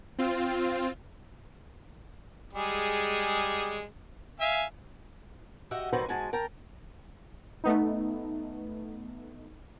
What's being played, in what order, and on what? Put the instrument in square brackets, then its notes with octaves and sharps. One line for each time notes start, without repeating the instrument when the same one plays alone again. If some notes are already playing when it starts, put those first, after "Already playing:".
[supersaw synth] C4 F4
[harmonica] G3 G#3 G#4
E5 F5 G#5
[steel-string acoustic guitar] F#4 G4 D#5 E5 F#5
C3 D#3 F#3 F#4 B4 C5
G#2 G#3 F#4 G#5 A5
A#4 G5 A5
[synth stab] A3 B3 D#4